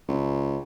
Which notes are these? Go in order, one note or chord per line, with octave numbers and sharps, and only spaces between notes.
C#2